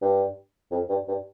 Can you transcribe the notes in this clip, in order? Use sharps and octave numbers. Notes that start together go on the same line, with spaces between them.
G2
F2
G2
G2